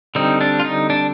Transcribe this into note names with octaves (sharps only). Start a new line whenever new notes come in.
D3 G3 C4 D#4
D4
F4
D#4
D4